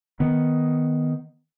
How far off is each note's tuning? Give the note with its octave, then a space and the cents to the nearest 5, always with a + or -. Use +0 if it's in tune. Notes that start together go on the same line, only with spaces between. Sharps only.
D#3 +0 B3 +0